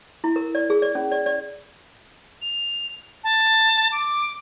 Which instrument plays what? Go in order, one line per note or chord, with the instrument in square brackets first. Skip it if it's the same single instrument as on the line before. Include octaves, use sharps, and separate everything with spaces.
[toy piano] E4
A#4
D5
G#4
D5
C#4
D5
D5
[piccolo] F7
A5
D6